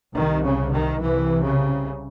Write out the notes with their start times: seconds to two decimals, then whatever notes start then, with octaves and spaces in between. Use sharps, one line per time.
0.15 C2 C3 D#3
0.44 C#3
0.72 D#3
1.01 C2 C3 E3
1.44 C#3